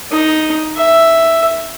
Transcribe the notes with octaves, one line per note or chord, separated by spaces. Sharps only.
D#4
E5